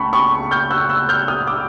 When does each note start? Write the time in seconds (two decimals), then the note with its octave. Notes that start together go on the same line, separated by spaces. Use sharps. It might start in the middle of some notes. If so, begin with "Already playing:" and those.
Already playing: C#2 A3 A5 B5 C#6
0.13 B5 C#6
0.51 F6 G6
0.71 E6 F#6
0.89 E6 F#6
1.09 F6 G6
1.28 D#6 F6
1.47 D6 E6